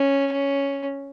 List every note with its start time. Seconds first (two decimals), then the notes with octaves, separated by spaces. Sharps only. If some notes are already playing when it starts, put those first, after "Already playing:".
Already playing: C#4
0.32 C#4